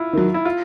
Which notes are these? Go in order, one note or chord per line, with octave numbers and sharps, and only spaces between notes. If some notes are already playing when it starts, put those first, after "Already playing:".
Already playing: E4 F4
D#3 F#3
E4
F4